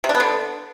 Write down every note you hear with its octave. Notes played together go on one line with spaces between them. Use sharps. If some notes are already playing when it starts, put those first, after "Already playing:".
C3
D4
B3
D3